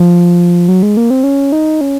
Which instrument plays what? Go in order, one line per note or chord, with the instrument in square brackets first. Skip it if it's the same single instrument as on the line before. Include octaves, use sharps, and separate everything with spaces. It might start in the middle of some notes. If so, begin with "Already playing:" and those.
Already playing: [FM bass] F3
F#3
G#3
A#3
C4
C#4
D#4
C#4